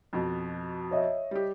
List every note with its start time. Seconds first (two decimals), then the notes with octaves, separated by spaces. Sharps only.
0.13 F2 B2
0.91 C#5 D#5 E5
1.31 G3 G4